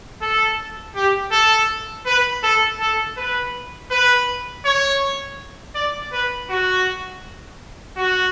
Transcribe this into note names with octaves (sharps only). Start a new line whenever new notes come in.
A4
G4
A4
B4
A4
A4
B4
B4
C#5
D5
B4
F#4
F#4